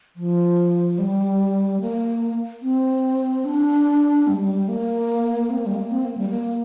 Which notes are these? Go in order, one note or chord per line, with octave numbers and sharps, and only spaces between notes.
F3
G3
A#3
C4
D4
G3
G3
G3
A#3
C4
A#3
G3
A#3
C4
A#3
G3
A#3